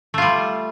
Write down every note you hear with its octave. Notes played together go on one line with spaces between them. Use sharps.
G3 A3 F4